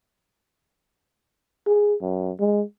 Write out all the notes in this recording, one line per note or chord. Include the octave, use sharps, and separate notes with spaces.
G#4
F#2
G#3